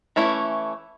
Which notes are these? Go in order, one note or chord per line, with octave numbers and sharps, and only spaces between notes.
E3 A3 C#4 E4